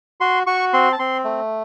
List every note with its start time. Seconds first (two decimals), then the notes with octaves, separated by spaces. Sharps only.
0.21 F#4 C6
0.47 F#4 C#6
0.73 C4 C6
0.92 A5
0.99 C4 C6
1.24 A3